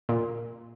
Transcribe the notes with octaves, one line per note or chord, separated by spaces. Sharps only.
A#2